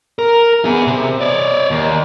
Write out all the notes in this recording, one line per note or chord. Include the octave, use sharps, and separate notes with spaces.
A#4
B3 G#4
C3
C#5 D5
D#2